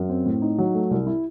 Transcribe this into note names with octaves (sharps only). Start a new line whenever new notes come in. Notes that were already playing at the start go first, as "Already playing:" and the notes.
Already playing: F#2
C4
A2
D#4
F#3
A3
C2
E4